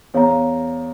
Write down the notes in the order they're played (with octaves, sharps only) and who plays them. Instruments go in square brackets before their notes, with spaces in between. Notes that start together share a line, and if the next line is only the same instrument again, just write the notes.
[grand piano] E2 [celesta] C#5 F5 A#5